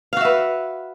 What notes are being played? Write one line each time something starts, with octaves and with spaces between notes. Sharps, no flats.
F#4 B4 E5 F5